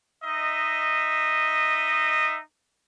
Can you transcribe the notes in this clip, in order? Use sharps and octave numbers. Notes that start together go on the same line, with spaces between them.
D#4 D#5 E5